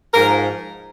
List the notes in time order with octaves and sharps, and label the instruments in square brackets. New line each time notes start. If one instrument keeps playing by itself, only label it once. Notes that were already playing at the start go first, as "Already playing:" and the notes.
[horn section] G#2 F3 A#4